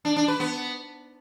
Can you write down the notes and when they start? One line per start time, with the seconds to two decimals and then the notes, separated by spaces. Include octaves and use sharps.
0.05 D4
0.16 D4
0.28 B4
0.40 B3